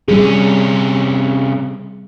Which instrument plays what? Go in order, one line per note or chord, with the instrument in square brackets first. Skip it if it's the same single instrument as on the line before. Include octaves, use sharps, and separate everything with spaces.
[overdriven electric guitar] C3 C#4 [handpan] G3 G#4